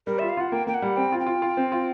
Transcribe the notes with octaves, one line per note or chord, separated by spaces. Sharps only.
G3 A#4
F4 E5
F5
F4 F#5
A#3 G5
A#3 G5
F#5
G3
C4 G5
F4
G5
F4
F4
C4
F4